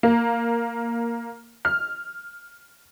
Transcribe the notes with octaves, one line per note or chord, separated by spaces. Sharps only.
A#3
F6